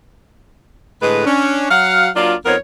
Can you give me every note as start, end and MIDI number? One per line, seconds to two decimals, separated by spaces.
1.02 1.25 45
1.02 1.25 50
1.02 1.25 56
1.02 1.25 71
1.26 1.67 61
1.26 1.67 62
1.70 2.08 54
1.70 2.08 77
1.70 2.08 78
2.15 2.34 54
2.15 2.34 58
2.15 2.34 62
2.15 2.34 65
2.45 2.55 41
2.45 2.55 59
2.45 2.55 63
2.45 2.55 70
2.45 2.55 72
2.45 2.55 73